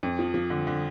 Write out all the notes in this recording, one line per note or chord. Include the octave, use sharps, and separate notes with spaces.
F2
F3
F3
D3
D3